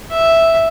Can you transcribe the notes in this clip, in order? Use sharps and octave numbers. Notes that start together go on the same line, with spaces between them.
E5